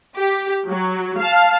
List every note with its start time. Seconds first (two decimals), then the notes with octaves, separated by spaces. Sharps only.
0.16 G4
0.68 F#3
1.18 F5 A5